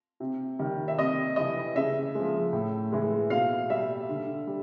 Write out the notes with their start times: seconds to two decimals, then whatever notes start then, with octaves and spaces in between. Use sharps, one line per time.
0.20 C3
0.59 D#3 G3
0.88 E5
0.98 C3 D#5
1.36 E3 G3 D#5
1.76 C#3 E5
2.15 F3 G#3
2.53 A2
2.92 E3 G#3
3.30 B2 F5
3.70 G3 E5
4.09 D3
4.47 G3